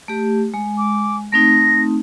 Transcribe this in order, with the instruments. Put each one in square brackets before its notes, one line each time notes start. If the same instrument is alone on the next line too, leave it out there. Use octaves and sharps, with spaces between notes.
[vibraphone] A3 G4
G#3
[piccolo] D6
[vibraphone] A3 C4 D#4 [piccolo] A#6